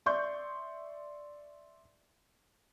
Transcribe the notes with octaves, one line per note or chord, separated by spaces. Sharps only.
D5 E5 C6 C#6 G6